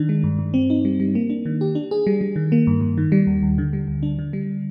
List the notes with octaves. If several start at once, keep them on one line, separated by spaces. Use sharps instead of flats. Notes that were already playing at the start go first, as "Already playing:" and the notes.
Already playing: D#3 D4
G#3
G2
G2
C4
D#4
G3
G3
A#3
D4
D#3
G4
D4
G#4
G3
G3
D#3
A#3
G2
G2
D#3
G3
D#2
D#2
D3
G3
D2
D4
D3
G3